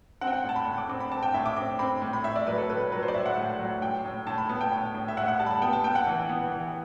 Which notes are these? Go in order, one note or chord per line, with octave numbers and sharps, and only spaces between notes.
C4 F#5
G5
F#5
A2 A5
B5
A2
D6
C4 D6
B5
C4 A5
G5
A2 E5
D6
C4 D6
C4 B5
A2
B5
A2 E5
D5
F#3 B4
A4
A2 B4
F#3 B4
C5
D5
A2 E5
F#5
A2
F#3
A2 G5
A2
A2 A5
B5
B3 A5
G5
A2
A2
E5
A2 F#5
F#5
G3 A5
B5
A5
B3 G5
A5
B3 G5
F#5
E3
B3
E3